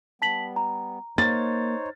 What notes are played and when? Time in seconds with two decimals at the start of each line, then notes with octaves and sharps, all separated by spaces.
0.22 G3 B3 A5 B6 F#7
0.56 A#5
1.18 A#3 D#4 C5 C#5 A6